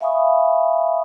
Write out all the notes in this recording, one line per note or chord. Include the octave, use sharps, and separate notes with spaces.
E5 F5 G#5 B5 C#6 D#6